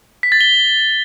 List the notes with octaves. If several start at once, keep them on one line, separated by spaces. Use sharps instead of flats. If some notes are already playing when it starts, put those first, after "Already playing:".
B6
A6
G7